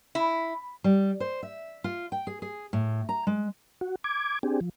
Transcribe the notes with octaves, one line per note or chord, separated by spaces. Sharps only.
E4
G3
C5
E5
F4
G5
G#4
G#4
A2
A#5
G#3
F#4
D6 G#6
C4 D4 G4 G#4
F3